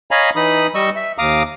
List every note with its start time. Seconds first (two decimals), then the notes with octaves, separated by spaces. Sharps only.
0.11 C#5 D#5 F5 G#5 A#5 B5
0.36 E3 D#4 B5 D#6
0.75 G3 D#5 C#6 E6
0.96 E5
1.18 D#2 F5 A#5 D6 D#6